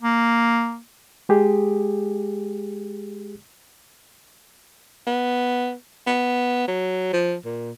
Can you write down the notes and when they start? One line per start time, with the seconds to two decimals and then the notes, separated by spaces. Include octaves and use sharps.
0.02 A#3
1.29 G#3 G4 G#4
5.07 B3
6.07 B3
6.68 F#3
7.13 F3
7.45 A#2